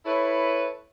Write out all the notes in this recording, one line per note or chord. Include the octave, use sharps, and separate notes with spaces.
E4 A4 B4 C#5